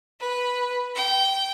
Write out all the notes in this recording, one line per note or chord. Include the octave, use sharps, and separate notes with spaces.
B4
G5